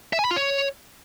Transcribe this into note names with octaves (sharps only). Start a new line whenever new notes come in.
E5
G#5
B5
F4
C#5